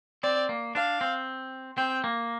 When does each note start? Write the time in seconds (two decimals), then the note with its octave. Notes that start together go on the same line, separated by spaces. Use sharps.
0.23 C4 D5
0.49 A#3
0.75 D4 F5
1.01 C4
1.77 C4 G5
2.04 A#3